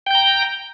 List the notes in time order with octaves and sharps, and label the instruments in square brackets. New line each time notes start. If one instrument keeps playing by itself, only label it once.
[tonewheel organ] G5
G6
A#5